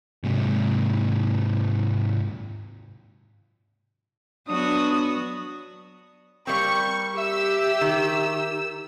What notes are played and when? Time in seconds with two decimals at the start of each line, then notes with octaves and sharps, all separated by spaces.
0.24 G#2 C3
4.48 F#3 B3 D4 F#4 D#6
6.47 G3 A#3 C4 G5 C#6
7.18 G4 E5 E6
7.81 D#3